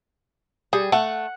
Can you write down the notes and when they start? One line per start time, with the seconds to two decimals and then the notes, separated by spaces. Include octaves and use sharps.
0.73 G3 G#4
0.92 A3 F#5